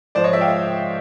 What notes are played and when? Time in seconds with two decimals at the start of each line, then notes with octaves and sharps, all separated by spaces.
0.15 G#2 F3 C5 D5
0.24 C#5 D#5
0.33 D5 E5
0.41 F5 G5